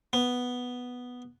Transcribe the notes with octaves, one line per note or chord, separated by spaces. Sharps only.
B3